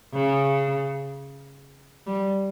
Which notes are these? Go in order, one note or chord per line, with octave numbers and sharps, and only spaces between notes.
C#3
G3